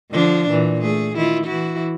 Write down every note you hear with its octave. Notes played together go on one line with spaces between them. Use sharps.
D3 F3 D4
A#2 E3
A3 G#4
D#3 E4 F4
E3 E4 F#4